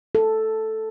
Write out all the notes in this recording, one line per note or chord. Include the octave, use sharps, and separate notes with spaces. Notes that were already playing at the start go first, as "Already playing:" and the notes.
A4